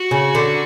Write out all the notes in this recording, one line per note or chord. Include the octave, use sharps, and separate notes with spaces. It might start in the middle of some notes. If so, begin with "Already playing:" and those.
Already playing: F#4
C#3
D3